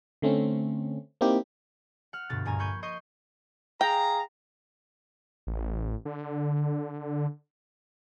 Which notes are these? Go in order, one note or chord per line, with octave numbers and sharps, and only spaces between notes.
D3 A3 C4 C#4
A#3 C4 D#4 E4 G4
F#5 F6
D2 G2 B2 A6
A#1 G2 G#5 A#5
A#3 B5 C#6 G6 G#6 D#7
D#5 C6 C#6 G6 D#7
G#4 F5 G5 A#5
A1
D3